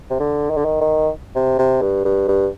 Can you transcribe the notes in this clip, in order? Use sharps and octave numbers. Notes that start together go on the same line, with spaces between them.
C3
D3
D#3
D3
D#3
D#3
C3
C3
G2
G2
G2